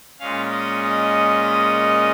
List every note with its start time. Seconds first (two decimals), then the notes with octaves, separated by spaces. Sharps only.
0.19 A#2 G#3 C#4 F5
0.51 D#5
0.84 D#5